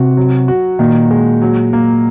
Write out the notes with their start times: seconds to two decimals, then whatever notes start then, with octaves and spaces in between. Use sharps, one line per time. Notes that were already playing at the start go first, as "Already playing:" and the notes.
Already playing: C3 F#4
0.17 F#3
0.48 F#4
0.79 A#2 D#3
1.11 G#3
1.42 F#3
1.73 A#3